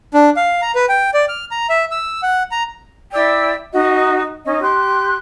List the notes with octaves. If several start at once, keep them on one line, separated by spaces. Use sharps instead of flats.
D4
F5
A#5
B4
G5
D5
F6
A#5
E5
E6
F#5
A#5
E4 D5 G5 E6
D#4 F#4 D#5
C#4 D#4 D#5
G4 C6 F#6